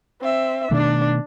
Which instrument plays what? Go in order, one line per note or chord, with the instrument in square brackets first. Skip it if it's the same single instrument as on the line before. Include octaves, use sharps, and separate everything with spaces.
[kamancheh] C4 E5
[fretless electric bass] B2 D#3 A3 [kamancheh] D4